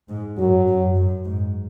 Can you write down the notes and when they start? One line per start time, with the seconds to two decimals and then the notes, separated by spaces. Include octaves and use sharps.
0.09 G#2
0.38 F#2 F#3
0.67 F#2
0.95 F#2
1.24 G#2